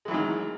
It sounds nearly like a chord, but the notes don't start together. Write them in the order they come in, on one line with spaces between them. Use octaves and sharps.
G#3 E3 F#3 D#3